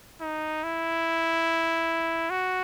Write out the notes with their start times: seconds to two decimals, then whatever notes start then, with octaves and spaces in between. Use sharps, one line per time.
0.21 D#4
0.64 E4
2.30 F#4